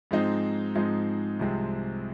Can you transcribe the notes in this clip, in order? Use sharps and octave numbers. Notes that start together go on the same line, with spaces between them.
G#2 F3 G#3 C4 D#4
G#2 F3 G#3 C4 D#4
C2 C3 F3 G#3 C4